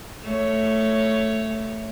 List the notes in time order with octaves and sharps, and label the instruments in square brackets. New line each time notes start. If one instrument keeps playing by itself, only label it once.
[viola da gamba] A3 C#5